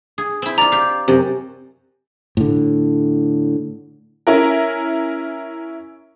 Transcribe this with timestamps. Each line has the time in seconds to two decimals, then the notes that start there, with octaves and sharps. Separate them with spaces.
0.18 G#4
0.42 C4 E4
0.58 F4 D5 A#5
0.72 G4 F5
1.08 F#2 C3
2.37 A2 D3
4.27 C#4 E4 A#4